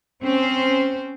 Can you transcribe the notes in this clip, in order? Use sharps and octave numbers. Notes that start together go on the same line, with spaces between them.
C4 C#4 C5